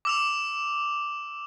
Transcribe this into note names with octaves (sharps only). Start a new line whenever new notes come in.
D6 E6 F7